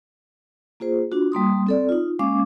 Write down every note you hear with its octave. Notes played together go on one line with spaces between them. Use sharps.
A#3 F4 G#4 C5
D4 F4 F#4
G3 A#3 C6 D#6
C4 A4 D5
D#4 F4
G#3 A#3 C#4 F5 D6